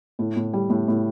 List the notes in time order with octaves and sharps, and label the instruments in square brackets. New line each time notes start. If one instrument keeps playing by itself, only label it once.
[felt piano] A2
A2
G3
A2
A2